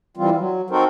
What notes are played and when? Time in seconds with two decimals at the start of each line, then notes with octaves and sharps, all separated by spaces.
0.17 E3 G3 C4 F4
0.37 F#3
0.70 C4 D#4 F#4 A4 A#4 C5